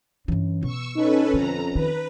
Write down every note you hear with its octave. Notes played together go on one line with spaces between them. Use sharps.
G2 E3 C#4
B2 C#6 E6
C#4 D#4 A4 B4
F2 D3 A#5
D#3 B4